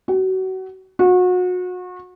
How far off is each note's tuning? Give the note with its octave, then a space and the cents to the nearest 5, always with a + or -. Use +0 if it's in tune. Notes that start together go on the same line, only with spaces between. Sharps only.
F#4 +30
F#4 -30